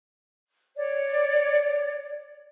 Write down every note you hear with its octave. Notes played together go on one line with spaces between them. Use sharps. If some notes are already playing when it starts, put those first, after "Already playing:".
C#5 D5